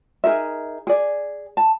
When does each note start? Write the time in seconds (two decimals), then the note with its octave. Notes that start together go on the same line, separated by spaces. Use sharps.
0.24 D#4 G#4 A#4 E5
0.87 G#4 D5
1.57 A5